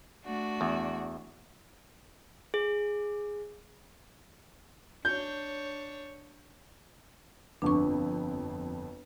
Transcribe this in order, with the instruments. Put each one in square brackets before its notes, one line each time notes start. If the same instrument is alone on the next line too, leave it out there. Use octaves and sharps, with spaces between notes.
[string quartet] A3 D4 F#4
[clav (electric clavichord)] E2
[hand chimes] G#4
[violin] D4 C#5 [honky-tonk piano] G6
[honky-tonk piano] G1 F2 [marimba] D4 C#6